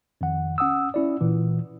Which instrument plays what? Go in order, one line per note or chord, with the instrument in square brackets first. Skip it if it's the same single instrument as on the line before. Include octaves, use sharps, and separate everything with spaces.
[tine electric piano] F2 D#3 F#5
C#4 F#5 D#6 E6
C#4 E4 D5
A#2 E3